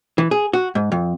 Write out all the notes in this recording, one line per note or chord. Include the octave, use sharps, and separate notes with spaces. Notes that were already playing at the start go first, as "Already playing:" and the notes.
E3
G#4
F#4
G#2
F2